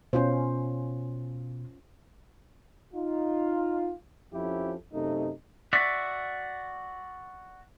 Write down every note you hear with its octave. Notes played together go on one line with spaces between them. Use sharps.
B2 C#4 F4 C5
D#4 F4
F2 F3 C#4 E4 G4 A4
F#2 C3 A3 D#4
F#4 D5 E5